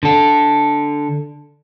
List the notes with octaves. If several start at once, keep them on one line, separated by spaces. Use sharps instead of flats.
D3 A4